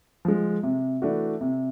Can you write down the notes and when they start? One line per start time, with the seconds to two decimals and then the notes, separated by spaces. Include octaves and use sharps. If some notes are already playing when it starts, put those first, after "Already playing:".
0.25 F3 G#3
0.63 C3
1.02 E3 A3 D4 F#4
1.41 C3